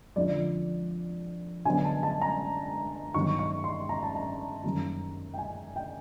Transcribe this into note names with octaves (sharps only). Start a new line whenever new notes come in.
F2 D3 F3 D5
D3 F#3 B3 D4 G#5
A5
A5
A#5
G2 D#3 F#3 B3 C#6
C#6
C6
A#5
A5
A#5
F#2 D#3 G3 A#3 C#4
G5
G#5
G5